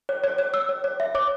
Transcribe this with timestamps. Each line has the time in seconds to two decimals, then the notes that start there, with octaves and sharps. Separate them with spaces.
0.09 C#5
0.24 C#5
0.38 C#5
0.54 C#5 E6
0.69 C#5
0.84 C#5
1.00 E5
1.15 C#5 D6